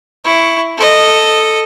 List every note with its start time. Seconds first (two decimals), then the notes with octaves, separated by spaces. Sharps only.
0.25 E4 C#6
0.77 A4 D#5